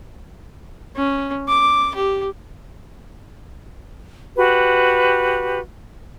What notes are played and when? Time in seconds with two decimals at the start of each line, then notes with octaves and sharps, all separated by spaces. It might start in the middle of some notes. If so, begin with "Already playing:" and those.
0.96 C#4
1.48 D6
1.95 G4
4.36 F#4 G4 B4